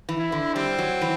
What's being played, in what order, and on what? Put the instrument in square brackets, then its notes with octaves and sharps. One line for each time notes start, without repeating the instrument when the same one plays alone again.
[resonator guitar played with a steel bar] E3
[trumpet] E4
[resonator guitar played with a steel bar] D3
[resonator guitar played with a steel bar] G3 [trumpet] C4
[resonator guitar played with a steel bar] F#3
E3